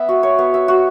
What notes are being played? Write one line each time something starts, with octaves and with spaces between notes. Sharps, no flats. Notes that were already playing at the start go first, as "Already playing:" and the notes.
Already playing: B3 E5
F#4
C#5
B3
E5
F#4